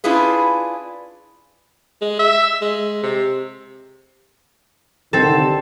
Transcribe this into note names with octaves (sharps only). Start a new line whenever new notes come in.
C#4 D4 E4 F4 G#4 B4
G#3
E5
G#3
C3
C2 D3 D#3 C4 A4